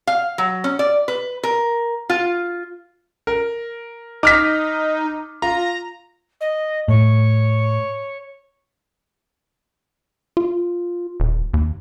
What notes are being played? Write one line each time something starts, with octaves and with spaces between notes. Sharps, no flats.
F5
F#3
C#4
D5
B4
A#4
F4
A#4
D#4 D6 F6 B6
F4 A#5
D#5
A2 C#5
F4
D#1
D#2